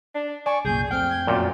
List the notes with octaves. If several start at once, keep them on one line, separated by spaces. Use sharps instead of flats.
D4
D5 G#5 C#6 D6
C2 F#2 A#2 G#4 G6
F2 A3 C4 G5 F6
G#6
F#2 A#2 D5